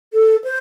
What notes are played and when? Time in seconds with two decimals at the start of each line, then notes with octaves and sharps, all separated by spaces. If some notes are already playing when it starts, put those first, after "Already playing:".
0.14 A4
0.44 C5